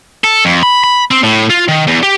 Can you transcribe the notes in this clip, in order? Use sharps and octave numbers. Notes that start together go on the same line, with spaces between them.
A4
F2
B5
B5
C4
A2
F4
D#3
E2
G4